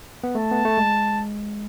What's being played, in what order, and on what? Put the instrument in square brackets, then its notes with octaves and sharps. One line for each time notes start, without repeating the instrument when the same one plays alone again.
[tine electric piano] B3
[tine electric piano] A3 [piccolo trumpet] A5
[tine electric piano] B3
A3
G#3